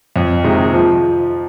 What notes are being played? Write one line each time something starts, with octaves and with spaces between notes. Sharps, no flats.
F2
C3 D#3 G#3 D#4
F3